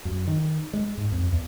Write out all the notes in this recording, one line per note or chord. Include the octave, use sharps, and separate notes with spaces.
F#2
D#3
G#3
G#2
F2
E2